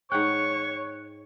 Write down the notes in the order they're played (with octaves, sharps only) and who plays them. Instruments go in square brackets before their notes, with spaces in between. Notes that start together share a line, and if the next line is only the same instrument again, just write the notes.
[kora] G#2 F#5 G5 [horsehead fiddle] C#5 [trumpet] C#6 [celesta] F#6